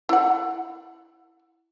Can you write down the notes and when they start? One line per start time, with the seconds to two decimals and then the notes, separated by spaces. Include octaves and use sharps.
0.09 E4 F#5